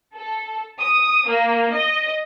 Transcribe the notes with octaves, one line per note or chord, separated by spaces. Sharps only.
A4
D#6
A#3
D#5